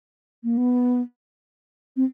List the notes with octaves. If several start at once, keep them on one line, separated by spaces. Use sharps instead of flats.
A#3
B3
C4